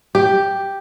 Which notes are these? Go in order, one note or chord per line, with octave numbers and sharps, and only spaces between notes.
G4